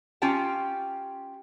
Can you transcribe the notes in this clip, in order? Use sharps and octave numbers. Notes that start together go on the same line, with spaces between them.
C#4 F4 G4 G5 A5